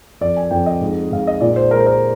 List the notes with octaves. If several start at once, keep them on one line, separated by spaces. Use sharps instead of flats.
F2 D5
G#5
F2 G5
D#5
G#2
G#2 F5
D#5
A#2 D5
C5
G#3 A#4
C5
A#4